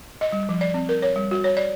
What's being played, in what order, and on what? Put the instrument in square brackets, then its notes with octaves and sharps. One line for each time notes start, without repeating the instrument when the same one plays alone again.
[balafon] D#5
G3
F3
D5
C4
A#4
C#5
G3
F#4
C#5
D5